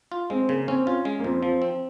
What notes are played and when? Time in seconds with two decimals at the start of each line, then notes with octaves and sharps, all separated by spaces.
0.12 F4
0.30 G#3 C4
0.49 C#3 A#3
0.68 C4 C#4
0.86 C#4 F4
1.05 G#3
1.19 A#3
1.24 F2 C4
1.43 F3
1.62 C4